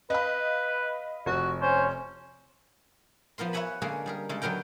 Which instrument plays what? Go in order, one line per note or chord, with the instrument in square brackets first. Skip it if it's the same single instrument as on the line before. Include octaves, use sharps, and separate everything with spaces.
[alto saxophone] B4 [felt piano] D#5 F5 B5
[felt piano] F1 [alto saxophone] F#4
[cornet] C#4 [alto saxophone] C5
[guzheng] F3 B3 A#4 C6
B4 C#5 E5 F#5 G#5 B5
D3 G#3 A#3 C#4 G#4
G3 G#4 A#4
C#3 G#3 A4
D3 F#3 B3 A#4 G5